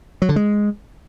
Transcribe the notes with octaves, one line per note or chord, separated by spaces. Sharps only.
F#3
D3
G#3